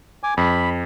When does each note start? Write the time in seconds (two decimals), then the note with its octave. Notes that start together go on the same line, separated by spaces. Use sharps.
0.23 G#5 D6
0.37 F2 B5